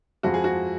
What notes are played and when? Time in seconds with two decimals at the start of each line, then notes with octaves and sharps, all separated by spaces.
0.23 F2 F3 G#3 F#4
0.34 G#4
0.44 F#4